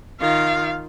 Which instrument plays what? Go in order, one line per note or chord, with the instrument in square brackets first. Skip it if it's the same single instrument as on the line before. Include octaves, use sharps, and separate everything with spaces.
[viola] D#3 F4 [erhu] F5